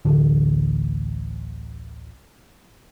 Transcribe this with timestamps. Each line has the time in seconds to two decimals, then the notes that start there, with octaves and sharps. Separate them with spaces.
0.05 A1 D2 D3